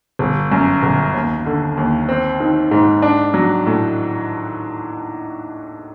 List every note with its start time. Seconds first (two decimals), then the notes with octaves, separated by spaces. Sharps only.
0.19 G1
0.52 F#2
0.83 G1
1.14 D#2
1.46 D3
1.77 D#2
2.09 C4
2.40 D#3
2.71 G#2
3.02 D4
3.34 F#3
3.66 A2